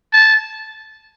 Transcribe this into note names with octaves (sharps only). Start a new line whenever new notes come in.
A5